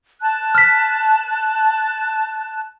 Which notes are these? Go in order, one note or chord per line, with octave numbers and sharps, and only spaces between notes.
A5 F#6
F6 B6